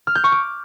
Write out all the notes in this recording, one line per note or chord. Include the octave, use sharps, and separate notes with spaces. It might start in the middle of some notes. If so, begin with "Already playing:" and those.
F6
G6
C#6
D6